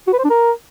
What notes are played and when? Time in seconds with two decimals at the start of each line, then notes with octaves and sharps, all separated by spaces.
0.08 F#4
0.13 B4
0.19 C5
0.25 D4
0.30 A#4